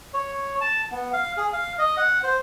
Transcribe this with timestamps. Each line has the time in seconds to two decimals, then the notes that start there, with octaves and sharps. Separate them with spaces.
0.14 C#5
0.61 A5
0.92 B3
1.13 F5
1.37 G#4
1.53 F5
1.79 D#5
1.97 F#5
2.23 C5